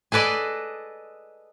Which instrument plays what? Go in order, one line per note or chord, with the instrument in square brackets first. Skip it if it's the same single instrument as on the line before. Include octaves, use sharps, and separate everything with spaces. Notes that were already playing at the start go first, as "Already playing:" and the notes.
[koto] G#4 A4 B4 D5 D#5